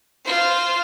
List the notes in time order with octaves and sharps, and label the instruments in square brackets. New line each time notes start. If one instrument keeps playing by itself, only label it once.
[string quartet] F4 C5